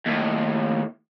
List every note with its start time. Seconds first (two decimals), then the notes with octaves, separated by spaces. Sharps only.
0.06 D#2 A2